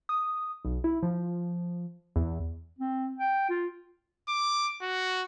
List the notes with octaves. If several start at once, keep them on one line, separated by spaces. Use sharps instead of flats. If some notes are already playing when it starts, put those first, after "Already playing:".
D#6
B1
E4
F3
E2
C4
G5
F4
D6
F#4